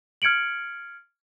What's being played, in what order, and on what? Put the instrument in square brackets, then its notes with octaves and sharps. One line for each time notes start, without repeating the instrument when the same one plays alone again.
[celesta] F6 G#6 C#7 D7 F#7